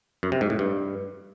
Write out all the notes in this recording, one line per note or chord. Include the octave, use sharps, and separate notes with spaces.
F#2
C3
G#2
A2
G2